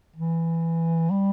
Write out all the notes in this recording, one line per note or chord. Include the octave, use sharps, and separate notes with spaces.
E3
G3